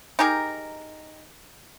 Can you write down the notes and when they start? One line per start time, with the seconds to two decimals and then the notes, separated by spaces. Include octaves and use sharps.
0.19 D#4 G4 G#4 A#4